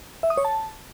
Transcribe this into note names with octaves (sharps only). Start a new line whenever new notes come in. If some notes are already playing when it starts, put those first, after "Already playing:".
E5
D#6
C#5
A5